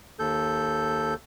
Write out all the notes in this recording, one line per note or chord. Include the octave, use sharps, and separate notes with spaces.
D#2 A4 G6